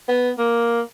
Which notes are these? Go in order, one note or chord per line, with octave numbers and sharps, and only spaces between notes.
B3
A#3